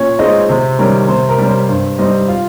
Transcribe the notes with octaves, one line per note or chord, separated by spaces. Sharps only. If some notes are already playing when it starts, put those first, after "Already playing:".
Already playing: A#2 C#4 C#5
G#3 C4 D#4 D#5
C3 C5
D#3 G3 C#4 A#4
C3 C5
A#4
G3 C#4
C5
G2 C5
G3 C4 D#4 D#5
F4 F5